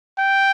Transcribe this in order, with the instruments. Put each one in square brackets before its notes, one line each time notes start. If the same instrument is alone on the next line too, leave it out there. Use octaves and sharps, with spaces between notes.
[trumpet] G5